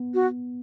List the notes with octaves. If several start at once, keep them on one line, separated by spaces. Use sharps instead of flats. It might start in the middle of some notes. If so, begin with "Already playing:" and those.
Already playing: B3
F#4